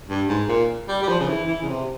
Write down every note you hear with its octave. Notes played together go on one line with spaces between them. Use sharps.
G2
G#2
A#2
G3
G3
F3
C#3
E3
E3
C#3
C3